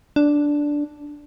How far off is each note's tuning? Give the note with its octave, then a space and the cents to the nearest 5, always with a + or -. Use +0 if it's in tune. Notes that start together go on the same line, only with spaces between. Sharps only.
D4 -5